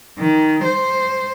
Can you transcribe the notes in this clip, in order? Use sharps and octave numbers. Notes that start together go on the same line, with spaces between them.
D#3
C5